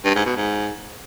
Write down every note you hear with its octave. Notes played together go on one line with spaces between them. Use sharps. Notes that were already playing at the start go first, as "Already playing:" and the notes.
G2
G#2
B2
G#2